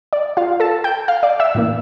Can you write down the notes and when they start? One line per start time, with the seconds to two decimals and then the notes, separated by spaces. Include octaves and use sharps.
0.13 D5
0.37 F4 F5
0.60 A4 A5
0.84 G5 G6
1.08 F5 F6
1.23 D5 D6
1.40 E5 E6
1.55 A2 E3 A#3